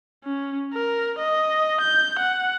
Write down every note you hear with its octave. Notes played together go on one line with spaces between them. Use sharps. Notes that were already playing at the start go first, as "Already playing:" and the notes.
C#4
A#4
D#5
G6
F#5